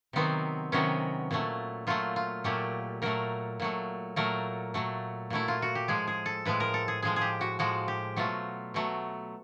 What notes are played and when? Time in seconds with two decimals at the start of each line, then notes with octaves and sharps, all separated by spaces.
0.13 C3 D#3 F#3 B3 C4
0.72 C3 D#3 F#3 B3 C#4
1.31 A#2 F#3 A3
1.87 A#2 F#3 A3 F4
2.16 F4
2.44 A#2 F#3 A3 G4
3.02 A#2 F#3 A3 A#4
3.60 A#2 F#3 A3
4.16 A#2 F#3 A3 A#4
4.74 A#2 F#3 A3
5.30 A#2 F#3 A3 E4
5.48 F4
5.62 F#4
5.75 G4
5.88 A2 F3 G#3 G#4
6.07 G#4
6.26 A4
6.45 A2 F3 G#3 B4
6.60 A#4
6.74 A4
6.88 G#4
7.02 A2 F3 G#3 G#4
7.16 G#4
7.22 G4
7.41 F#4
7.59 A2 F3 G#3 F#4
7.88 G4
8.16 B2 F#3 A3 F4
8.74 B2 F#3 A3